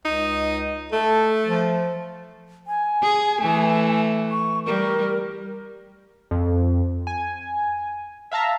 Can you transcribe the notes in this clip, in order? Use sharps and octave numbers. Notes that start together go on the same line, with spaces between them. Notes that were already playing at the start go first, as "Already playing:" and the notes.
C#2 D#4
A3 A4
F3
G#5
G#4
E3 A3
C#6
G3 A#4
F2
G#5
E5 F5 A5 A#5